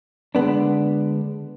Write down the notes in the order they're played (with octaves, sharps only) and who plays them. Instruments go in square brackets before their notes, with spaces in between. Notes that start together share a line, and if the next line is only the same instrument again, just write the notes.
[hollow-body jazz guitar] D3 G#3 B3 D4